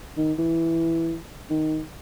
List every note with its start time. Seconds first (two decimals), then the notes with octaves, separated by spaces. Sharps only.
0.17 D#3
0.38 E3
1.50 D#3